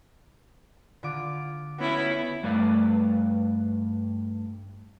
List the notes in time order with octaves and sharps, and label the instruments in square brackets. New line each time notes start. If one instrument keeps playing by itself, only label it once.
[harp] D3 F4 D6
[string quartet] B3 C#4 E4 [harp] F#4
[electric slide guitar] G2 A3 B4 D5 F5